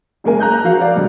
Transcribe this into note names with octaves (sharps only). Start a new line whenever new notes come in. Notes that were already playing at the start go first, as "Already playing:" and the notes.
F#1 G#3 A#3 G#5
A#5 F#6 G6
F3 F#4 F5
D5
D2 G2 B2